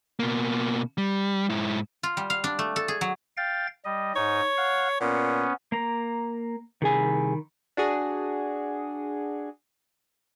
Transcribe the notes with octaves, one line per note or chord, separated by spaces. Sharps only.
B2 A#3
G3
G#2 E4
F4
G3
F5
D4
A3
A4
G#4
F#3
F5 G5 A6
G3 D#5
G#2 D#4 C#5
F5 F#5
A#2 B3 C#4
A#3 A#5
C2 D#3 G#4 G#5 B5
D4 F#4 G#4